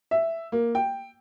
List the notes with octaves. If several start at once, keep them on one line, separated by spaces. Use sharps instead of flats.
E5
A#3
G5